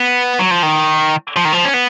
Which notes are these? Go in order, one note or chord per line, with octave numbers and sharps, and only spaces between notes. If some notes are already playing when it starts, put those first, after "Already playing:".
Already playing: B3
F#3
F3
D#3
F3
D#3
F3
C#4
B3